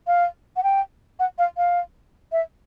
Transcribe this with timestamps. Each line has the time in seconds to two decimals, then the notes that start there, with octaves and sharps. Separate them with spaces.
0.07 F5
0.56 F#5
0.63 G5
1.19 F#5
1.38 F5
1.57 F5
2.32 E5